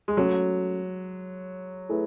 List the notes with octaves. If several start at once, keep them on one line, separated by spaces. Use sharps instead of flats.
G#3
F#3 A3 C#4 F#4
A3 E4 G#4 B4